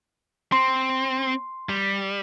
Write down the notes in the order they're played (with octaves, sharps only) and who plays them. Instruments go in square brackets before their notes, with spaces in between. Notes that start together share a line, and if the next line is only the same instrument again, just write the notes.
[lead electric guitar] C4 [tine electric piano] C6
[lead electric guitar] G3